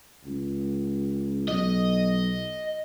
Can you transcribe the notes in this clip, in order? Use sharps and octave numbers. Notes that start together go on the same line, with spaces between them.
C#2
B1 D#5